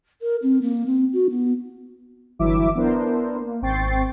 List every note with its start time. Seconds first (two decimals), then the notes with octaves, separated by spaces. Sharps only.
0.22 A#4
0.43 C4
0.62 A#3
0.86 C4
1.13 F#4
1.30 B3
2.39 G1 E3 F#3 E4 E5 D6
2.75 B3 D4 E4 A#4 C5
3.40 A#3
3.62 G#1 C4 G5 C#6 A6 C7